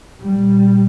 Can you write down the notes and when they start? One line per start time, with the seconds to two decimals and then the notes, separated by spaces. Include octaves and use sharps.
0.19 A#2 G3